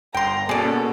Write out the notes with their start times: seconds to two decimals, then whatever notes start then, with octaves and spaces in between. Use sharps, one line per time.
0.14 G1 G5 A#5 C6
0.49 B2 A#3 C#4 G#4 A4 D5